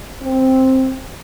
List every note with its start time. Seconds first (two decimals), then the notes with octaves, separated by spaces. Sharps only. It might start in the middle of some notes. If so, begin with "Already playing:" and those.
0.22 C4